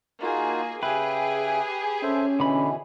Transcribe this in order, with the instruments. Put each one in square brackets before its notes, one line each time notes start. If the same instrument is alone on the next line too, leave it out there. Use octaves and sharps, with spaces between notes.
[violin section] A#3 G#4 [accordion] D#4 F4 F#4
[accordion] C#3 E5 G5 [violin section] G4 G#4 [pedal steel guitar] B4
[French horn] C#4 [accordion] A4 C5 E5
[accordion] B2 E3 [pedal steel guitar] D3 B5